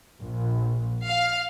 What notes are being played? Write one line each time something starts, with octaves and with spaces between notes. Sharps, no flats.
A#1
F5